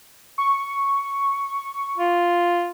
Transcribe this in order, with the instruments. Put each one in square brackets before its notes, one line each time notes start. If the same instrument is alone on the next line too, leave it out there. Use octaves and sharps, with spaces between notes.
[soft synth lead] C#6
[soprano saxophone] F4